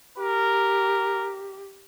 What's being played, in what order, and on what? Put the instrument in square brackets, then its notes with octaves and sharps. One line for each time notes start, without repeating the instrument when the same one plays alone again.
[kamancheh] G4 [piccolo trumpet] A#4